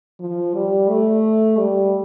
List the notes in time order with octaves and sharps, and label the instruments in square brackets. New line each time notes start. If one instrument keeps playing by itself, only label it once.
[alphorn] F3
G3
A3
G3